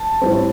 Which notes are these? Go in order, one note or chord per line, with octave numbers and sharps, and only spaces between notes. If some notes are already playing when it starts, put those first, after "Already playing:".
Already playing: A5
A2 G3 C4